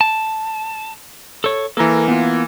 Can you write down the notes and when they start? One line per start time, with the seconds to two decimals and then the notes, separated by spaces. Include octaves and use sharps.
0.01 A5
1.44 A4 C#5
1.77 E3 A#3 A4 A#4
2.08 B3 F4